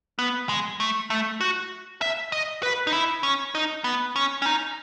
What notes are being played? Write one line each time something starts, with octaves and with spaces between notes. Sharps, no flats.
B3
G#3
A3
A3
F#4
E5
D#5
B4
D#4
E4
C#4
D#4
B3
C#4
C#4
D#4